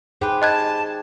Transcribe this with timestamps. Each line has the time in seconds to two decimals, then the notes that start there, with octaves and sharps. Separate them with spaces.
0.21 D#4 G4 G#4 B4 C5
0.42 D#5 A5 F#6 G#6